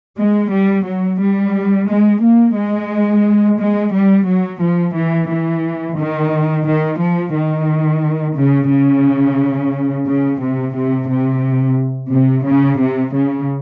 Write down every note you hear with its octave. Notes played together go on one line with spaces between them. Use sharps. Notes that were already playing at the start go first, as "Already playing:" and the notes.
G#3
G3
F#3
G3
G#3
A#3
G#3
G#3
G3
F#3
F3
E3
E3
D#3
D#3
F3
D#3
C#3
C#3
C#3
C3
C3
C3
C3
C#3
C3
C#3